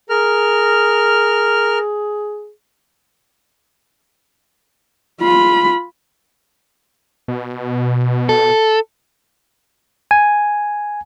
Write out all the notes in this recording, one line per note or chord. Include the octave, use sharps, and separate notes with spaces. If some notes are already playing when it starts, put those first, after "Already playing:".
G#4 A#4 F6
F4 B5
B2
A4
G#5